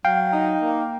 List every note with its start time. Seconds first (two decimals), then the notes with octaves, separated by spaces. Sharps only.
0.05 F#3 F5 G5
0.33 D#4
0.62 A#3